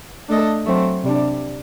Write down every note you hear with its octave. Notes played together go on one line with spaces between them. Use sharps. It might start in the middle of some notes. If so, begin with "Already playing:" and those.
A3 D4 A4 D#5
F#3 A3 C4
C3 G3 D4